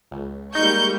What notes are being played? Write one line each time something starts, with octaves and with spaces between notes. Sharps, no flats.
C#2
G3 G#3 A#3 D#4 C#6 G6